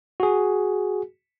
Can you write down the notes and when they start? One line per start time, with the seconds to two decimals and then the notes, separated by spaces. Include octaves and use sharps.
0.20 F#4 G#4